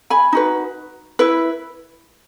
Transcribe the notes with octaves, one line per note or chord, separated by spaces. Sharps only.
G#5 B5
D#4 F#4 B4
E4 B4